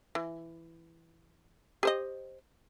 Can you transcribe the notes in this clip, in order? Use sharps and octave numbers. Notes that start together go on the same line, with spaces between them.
E3
G4 C5 D#5